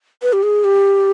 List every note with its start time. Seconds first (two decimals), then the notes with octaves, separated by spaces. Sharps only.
0.23 B4
0.33 G4
0.43 G#4
0.64 G4